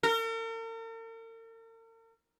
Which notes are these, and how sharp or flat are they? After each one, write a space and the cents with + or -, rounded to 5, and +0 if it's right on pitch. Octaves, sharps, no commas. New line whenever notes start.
A#4 -45